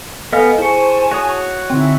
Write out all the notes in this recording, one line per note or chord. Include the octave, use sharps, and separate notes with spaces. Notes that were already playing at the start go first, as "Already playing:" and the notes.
B3 A4 D#5 F5 G5 G#5 F6
E4 G#4 C5 G#5 A5 C#6 C#7
F#4 C#5 D#6
D3 C4 D#4 E4 G#4 G5